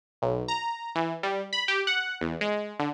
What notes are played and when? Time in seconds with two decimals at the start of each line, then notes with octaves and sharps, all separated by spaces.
0.22 B1
0.48 A#5
0.95 E3
1.23 G3
1.53 B5
1.68 G4
1.87 F#5
2.21 E2
2.41 G#3
2.80 D3